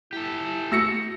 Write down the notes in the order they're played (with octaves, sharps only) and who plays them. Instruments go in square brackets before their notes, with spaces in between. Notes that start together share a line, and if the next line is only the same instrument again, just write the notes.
[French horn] E4 [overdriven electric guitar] G4 A4
[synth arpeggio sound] A3 F#4 [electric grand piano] E6 A#6 C#7